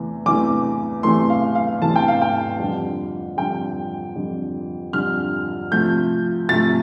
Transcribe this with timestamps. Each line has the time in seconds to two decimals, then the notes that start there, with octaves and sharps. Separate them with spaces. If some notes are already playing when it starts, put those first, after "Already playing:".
Already playing: E2 C3 E3 A3
0.26 E2 C3 E3 A3 D6
1.03 E2 C3 E3 A3 C6
1.30 F5
1.55 F5
1.81 E2 C3 E3 A3 A5
1.96 G5
2.08 F5
2.22 G5
2.59 F2 D3 G3
3.37 F2 D3 G3 G5
4.16 F2 D3 G3
4.93 F2 D3 G3 F6
5.71 C3 F3 A3 G6
6.49 C3 F3 A3 A6